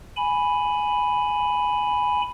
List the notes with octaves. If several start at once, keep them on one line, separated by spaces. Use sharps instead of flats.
G#5 B5